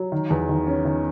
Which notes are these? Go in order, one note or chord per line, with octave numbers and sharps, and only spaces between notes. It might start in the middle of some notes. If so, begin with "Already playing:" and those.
Already playing: F#3
D#3
E2
D#3
C#4
D#3